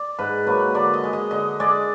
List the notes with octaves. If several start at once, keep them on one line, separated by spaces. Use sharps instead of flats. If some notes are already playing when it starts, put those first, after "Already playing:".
Already playing: D5
G#2 B4
F#3 A#3 B4
D3 D5
D#5
G#3
D#5
D3 D#5
G#3 D5